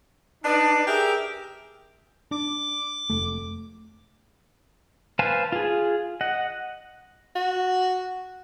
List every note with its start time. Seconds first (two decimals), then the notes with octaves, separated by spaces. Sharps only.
0.44 D4 D#4 B4 D5
0.87 G4 G#4 A#4 E5
2.31 D4 D6
3.10 F1 A3
5.19 B4 C5 F5 G#5 A5
5.52 F4 G#4
6.21 D#5 F#5
7.35 F#4